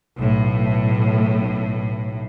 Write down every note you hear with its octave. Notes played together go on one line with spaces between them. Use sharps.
B1 A2